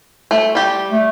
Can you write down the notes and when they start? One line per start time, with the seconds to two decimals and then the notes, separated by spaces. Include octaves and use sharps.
0.31 A3
0.55 G3 G4
0.91 A3